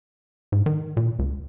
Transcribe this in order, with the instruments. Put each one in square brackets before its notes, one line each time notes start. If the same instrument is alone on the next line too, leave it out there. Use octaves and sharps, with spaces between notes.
[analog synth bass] G#2
D#3
A#2
C#2